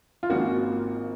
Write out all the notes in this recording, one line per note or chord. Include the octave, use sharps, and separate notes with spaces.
F4
G#1 G#2 F3 A#3 C#4 F#4